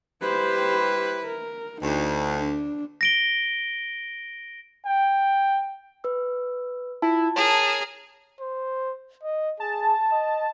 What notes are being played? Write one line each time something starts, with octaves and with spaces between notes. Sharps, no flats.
G3 E4 G4 B4 C5
A#4
D2 D#4
D4
A#6 D7 G7
G5
B4 E6
E4 F4 A5
G#4 A#4 C#5 A5
C5
D#5
G#4 A5
D#5